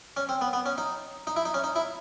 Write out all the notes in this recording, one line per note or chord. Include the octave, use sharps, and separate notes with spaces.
C#4
C4
B3
B3
C#4
D#4
D#4
E4
D#4
C#4
D#4
E4